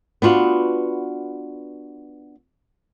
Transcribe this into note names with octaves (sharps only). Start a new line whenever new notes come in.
B3 D4 F4 F#4